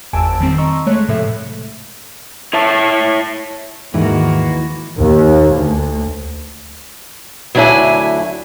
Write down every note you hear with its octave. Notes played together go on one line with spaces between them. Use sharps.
G1 E2 G#5 A5 E6 D7
F2 D#3 G3 C4
D#5 A#5 C6 C#6 E6
G#3 A3 C#5 F#6
A2 C3 F3 A4 E5
E4 C#5 E5 A5
D#2 G#2 D#3 E3 A#3 F#4 E5
D#2
D2
D2 F#3 D4 E4 E5 G#5